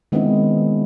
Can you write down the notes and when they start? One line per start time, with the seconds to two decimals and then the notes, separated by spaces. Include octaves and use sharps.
0.12 D#3 G#3 B3 C4 D4 E4